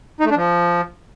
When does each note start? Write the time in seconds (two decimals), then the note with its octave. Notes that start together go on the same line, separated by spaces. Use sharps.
0.20 D#4
0.26 A3
0.31 D4
0.36 F3